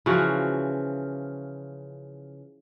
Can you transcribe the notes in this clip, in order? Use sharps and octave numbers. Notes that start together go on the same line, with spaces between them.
C#3 E3 F3 F#4